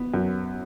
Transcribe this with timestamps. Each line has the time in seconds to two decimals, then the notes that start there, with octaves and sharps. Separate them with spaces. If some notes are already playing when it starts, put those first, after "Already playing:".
Already playing: B3
0.14 F#2